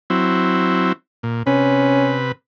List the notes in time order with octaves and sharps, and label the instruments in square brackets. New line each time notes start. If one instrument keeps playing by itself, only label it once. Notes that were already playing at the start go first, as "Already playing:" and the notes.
[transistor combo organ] F#3 C4 E4
A#2
[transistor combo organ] C3 B4 [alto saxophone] C#4